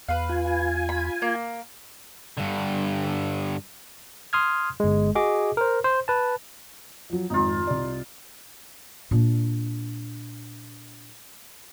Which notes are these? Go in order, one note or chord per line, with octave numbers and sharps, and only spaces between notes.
E2 B4 F5
F4 G#5
B5
A#3
G2 D3
C6 D#6 F6 G#6
G1 G#3
F#4 G#4 D#5 D6
A#4 C5
C5
B4 A5
F3 F#3
G#1 F2 G#2 D#4 F4
C2 D5
A#2 D4